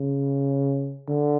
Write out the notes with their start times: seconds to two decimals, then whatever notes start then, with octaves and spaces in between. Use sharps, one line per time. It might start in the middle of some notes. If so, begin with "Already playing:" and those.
Already playing: C#3
1.08 D3